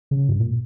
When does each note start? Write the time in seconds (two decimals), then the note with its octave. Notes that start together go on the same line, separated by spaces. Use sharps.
0.11 C#3
0.29 G2
0.40 A#2